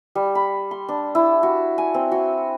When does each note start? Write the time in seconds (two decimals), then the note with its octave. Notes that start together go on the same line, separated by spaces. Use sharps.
0.15 G3
0.35 B5
0.71 C6
0.88 D4
1.15 E4
1.43 F#4
1.78 G#5
1.94 C4
2.12 F#4